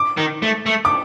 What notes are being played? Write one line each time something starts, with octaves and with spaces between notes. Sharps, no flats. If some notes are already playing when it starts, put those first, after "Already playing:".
Already playing: D6
D#3
A3
A3
D6